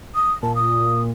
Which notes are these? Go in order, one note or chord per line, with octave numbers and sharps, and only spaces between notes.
D#6
A#2 A5
D#6